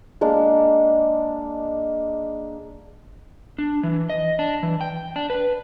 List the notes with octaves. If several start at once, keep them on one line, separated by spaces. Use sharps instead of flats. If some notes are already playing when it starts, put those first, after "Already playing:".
G#3 A#3 D4
D4
E3
D#5
D4
E3
G5
D4
B4